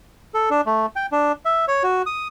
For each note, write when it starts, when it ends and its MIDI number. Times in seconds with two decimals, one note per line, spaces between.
0.34 0.49 69
0.51 0.61 62
0.66 0.86 57
0.96 1.06 79
1.12 1.32 62
1.45 1.65 76
1.68 1.83 73
1.83 2.02 66
2.06 2.28 87